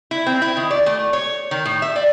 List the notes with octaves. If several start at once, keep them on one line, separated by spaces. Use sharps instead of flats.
E4
C4
E4
D#3
D5
A3
C#5
D#3
A2
E5
D5